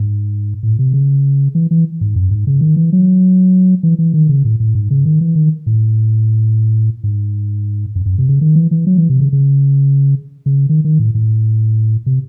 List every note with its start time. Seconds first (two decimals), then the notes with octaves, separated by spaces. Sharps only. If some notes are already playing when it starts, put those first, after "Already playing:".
Already playing: G#2
0.63 A2
0.79 C3
0.93 C#3
1.55 E3
1.71 E3
2.01 G#2
2.16 F#2
2.31 G#2
2.47 C#3
2.61 D#3
2.76 E3
2.93 F#3
3.83 E3
3.99 E3
4.14 D#3
4.29 C#3
4.45 A2
4.60 A2
4.75 G#2
4.90 C#3
5.05 D#3
5.21 E3
5.35 D#3
5.66 A2
7.04 G#2
7.95 F#2
8.06 F#2
8.18 C3
8.29 C#3
8.41 D#3
8.55 E3
8.71 E3
8.87 F#3
8.98 E3
9.09 C3
9.21 C#3
9.33 C#3
10.46 C#3
10.69 D#3
10.84 D#3
10.99 A2
11.15 A2
12.06 C3